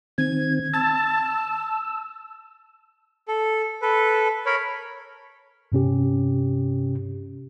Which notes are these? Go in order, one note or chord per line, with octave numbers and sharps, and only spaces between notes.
D#3 C4 G#6
A5 E6 A6
E6
A4
A4 B4
A#4 C#5 B5
G2 C3 C#4 G4